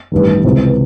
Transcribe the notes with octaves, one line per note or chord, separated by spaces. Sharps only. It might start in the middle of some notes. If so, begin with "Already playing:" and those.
A1 G2 D#3
C#2 C3 E3